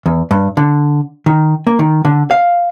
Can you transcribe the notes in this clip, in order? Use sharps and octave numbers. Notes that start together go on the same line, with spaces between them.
E2
G2
D3
D#3
A#3
D#3
D3
F5